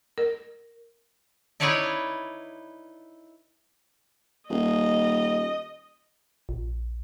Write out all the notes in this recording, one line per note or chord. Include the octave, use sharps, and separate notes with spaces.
A#4
D#4 E4 B4 C#5 D5 E5
D#1 D#5
A#1